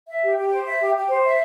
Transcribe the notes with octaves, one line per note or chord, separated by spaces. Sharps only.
E5
G4
G4
C5
E5
G4
G4
C5
E5